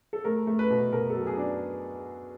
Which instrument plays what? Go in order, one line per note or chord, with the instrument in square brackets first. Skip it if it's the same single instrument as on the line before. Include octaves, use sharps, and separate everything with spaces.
[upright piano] A4
A3 A#4
A3
B4
B2
B2 A#4
A4
F#3
G#4
D4